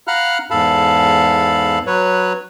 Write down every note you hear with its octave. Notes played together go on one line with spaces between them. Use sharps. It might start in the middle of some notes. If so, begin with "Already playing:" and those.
F5 F#5 A#5 B5 F6 F#6
E2 G#2 A4 F5 A5 B5
F#3 B4 C#5